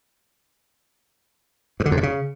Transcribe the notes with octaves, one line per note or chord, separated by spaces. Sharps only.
G2
D3
F2
C3
C#3